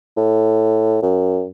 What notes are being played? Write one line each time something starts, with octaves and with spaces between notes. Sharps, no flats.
A2
F#2